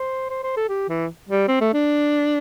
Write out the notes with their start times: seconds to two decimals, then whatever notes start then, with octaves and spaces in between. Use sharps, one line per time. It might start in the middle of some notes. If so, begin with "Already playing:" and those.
Already playing: C5
0.30 C5
0.43 C5
0.56 A4
0.69 G4
0.89 E3
1.29 G3
1.48 C4
1.61 A3
1.74 D4